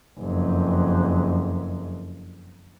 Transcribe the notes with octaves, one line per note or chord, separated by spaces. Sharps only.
F#1 F2